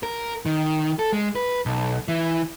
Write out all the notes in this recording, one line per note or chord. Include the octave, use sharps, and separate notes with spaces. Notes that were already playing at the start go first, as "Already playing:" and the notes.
A#4
D#3
A4
G#3
B4
B1
E3